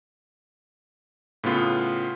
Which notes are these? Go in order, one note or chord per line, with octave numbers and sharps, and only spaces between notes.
A2 C#3 B3 F4